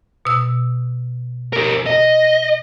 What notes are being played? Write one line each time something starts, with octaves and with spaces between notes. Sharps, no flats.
B2 E6
G4 A#4
D#5